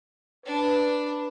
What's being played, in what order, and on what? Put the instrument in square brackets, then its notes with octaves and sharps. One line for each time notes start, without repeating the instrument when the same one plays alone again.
[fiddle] D4 [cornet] B4